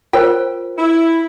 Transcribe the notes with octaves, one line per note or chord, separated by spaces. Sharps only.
F4 A#4 C5 G5
E4